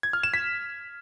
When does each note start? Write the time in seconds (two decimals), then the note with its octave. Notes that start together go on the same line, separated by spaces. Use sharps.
0.03 G#6
0.13 F6
0.23 E7
0.34 B6